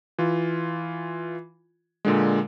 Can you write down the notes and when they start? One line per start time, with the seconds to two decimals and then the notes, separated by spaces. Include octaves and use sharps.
0.18 E3 F4
2.05 A#2 D3 G#3